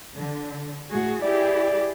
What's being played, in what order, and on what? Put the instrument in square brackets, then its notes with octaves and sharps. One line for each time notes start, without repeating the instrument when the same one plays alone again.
[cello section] D3
A2 F#4 G#4
[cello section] E4 G4 G#4 [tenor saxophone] D5